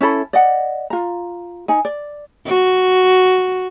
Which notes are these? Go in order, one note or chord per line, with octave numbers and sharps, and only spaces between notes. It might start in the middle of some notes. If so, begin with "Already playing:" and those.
C#4 E4 A4 B5
D5 D#5 F#5
F4 A#5
D#4 G#5
D5
F#4